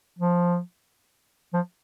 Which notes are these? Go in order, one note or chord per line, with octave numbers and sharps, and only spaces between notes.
F3
F3